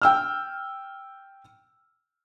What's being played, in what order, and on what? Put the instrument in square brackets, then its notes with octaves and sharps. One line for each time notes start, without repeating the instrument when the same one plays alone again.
[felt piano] G5 E6 F6